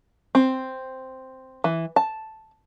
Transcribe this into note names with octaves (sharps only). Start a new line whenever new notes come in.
C4
E3
A5